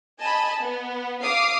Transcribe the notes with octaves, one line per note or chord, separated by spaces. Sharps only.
D#5 G#5 A5 B5
B3
F5 D6 D#6 C7